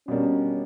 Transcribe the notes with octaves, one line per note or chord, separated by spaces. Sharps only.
B2 G3 A#3 C#4 D4